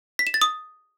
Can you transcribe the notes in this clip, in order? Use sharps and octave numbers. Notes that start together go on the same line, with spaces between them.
B6
E7
A6
D#6